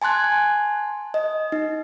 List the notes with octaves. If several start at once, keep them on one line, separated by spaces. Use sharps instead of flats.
G#5 A5 C6 F#6 G#6
D#5
D#4